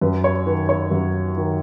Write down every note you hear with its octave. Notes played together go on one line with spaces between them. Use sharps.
F#2 B4
C#5
D#3 B4
C#5
F#2
D#3